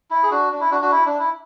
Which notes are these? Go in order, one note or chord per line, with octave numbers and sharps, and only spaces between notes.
E4
G#4
D4 F#4
D4
E4
D4 F#4
D4 F#4
E4
D4
E4